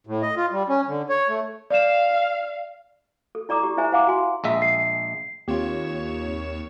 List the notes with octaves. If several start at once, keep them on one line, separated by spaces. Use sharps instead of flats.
A2
D#5
F4
G3
C#4
D3
C#5
A3
D5 F5 E7
A4
E4 D5 A#5 D6 D#6
G4
E4 C5 E5 G#5 A#5
C5 F5 F#5 G#5 A#5 D6
F#4 G#5 C6
A#1 G#3 E5
C7
D#2 A#3 C4 F4 G4 C#5 E7